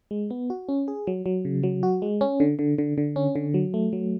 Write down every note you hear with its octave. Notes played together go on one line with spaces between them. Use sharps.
G#3
B3
F#4
C#4
G#4
F#3
F#3
C#3
F#3
F#4
G#3
C#4
D3
D3
D3
D3
C#4
D3
F#3
A3
F#3